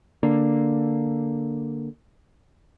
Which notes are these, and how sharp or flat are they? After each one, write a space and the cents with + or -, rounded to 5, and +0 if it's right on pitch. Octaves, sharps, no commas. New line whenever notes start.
D3 +0 A#3 +0 D4 +0